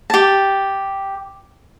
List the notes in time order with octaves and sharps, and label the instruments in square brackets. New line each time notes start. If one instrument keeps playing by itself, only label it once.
[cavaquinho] G4 A5